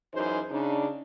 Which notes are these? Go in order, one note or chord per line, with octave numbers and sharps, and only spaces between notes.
F#2 E3 F#3 D#4 G#4 C5
C#3 D4 D#4